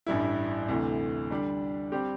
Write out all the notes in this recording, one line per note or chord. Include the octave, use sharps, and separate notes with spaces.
A1 G2 G3 E4
D2 C3 E3 A3
D3 G3 D4
G3 C4 G4